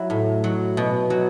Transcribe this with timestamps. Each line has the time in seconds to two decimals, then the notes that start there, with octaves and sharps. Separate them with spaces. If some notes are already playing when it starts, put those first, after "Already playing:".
Already playing: F#3 E4
0.10 A2
0.44 F#3
0.77 B2
1.10 F#3